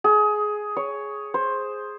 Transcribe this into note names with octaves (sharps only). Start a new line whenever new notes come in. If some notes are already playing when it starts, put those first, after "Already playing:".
G#4
C#5
C5